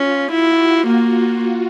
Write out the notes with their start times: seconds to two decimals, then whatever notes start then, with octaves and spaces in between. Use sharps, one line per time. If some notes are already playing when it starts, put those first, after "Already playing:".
Already playing: C#4 F4
0.31 E4 F#4
0.87 A#3